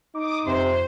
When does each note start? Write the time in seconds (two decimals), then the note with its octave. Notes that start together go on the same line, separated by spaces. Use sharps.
0.15 D#4 D6 D#6
0.46 F2 C3 C5